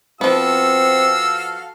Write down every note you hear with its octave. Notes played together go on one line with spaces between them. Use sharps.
F3 B3 C4 F#4 A4 F5 E6